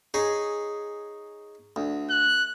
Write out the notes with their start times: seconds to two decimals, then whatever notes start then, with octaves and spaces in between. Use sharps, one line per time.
0.14 D#4 G#4 C#5
1.76 D2
2.10 F#6